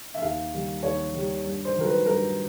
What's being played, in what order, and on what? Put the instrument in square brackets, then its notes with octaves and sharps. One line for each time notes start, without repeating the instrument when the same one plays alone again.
[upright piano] E5
D#2 F5
D#3 G3
D#2 C#5
D#3 G3
G2
C5
D#3 F#3 A#4
B4
G2 A#4